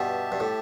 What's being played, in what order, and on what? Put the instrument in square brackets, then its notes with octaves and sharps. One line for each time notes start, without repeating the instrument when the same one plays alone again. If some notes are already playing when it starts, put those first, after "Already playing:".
Already playing: [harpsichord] G2 B2 [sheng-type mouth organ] G4 E5 A5
[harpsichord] G2
A2